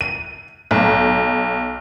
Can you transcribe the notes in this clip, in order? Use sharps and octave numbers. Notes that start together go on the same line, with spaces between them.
D#7
B1